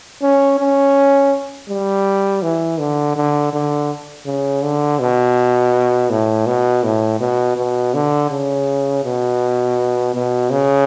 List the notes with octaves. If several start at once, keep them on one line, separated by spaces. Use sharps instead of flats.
C#4
C#4
G3
E3
D3
D3
D3
C#3
D3
B2
A2
B2
A2
B2
B2
D3
C#3
B2
B2
C#3